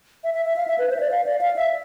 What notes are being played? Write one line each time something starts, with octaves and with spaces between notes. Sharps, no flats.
E5
E5
E5
F5
E5
B4
C5
E5
D5
F5
D5
F5
E5